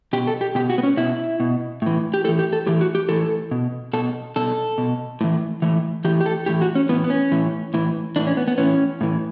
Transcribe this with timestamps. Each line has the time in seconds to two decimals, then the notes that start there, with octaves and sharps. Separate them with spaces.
0.13 B2 G4
0.27 A4
0.41 G4
0.55 B2 G4
0.70 F#4
0.78 B3
0.83 C#4
0.97 B2 E4
1.40 B2
1.82 A2 E3
2.14 G4
2.24 A2 A4
2.28 E3
2.39 G4
2.53 A4
2.66 A2 E3 G4
2.81 F#4
2.95 G4
3.09 A2 E3 A4
3.51 B2
3.93 B2 A4
4.36 B2 A4
4.78 B2
5.21 A2 E3
5.62 A2 E3
6.05 E3 G4
6.07 A2
6.21 G4
6.26 A4
6.46 A2 E3 G4
6.61 F#4
6.75 C#4
6.89 A2 E3 B3
7.04 B3
7.10 C#4
7.32 A2 E3
7.74 A2 E3
8.16 A2 E3 D4
8.27 C#4
8.37 B3
8.48 B3
8.58 A2 E3 C#4
9.01 A2 E3